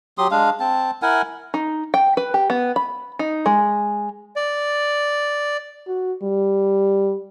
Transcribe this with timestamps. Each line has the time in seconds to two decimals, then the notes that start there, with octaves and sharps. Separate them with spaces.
0.18 F#3 G4 C6 D#6
0.31 G#3 D4 F5
0.60 C4 A5
1.02 E4 A#4 F#5 G#5
1.54 D#4
1.94 G5
2.17 B4
2.34 G4
2.50 B3
2.76 B5
3.19 D#4
3.46 G#3
4.36 D5
5.87 F#4
6.23 G3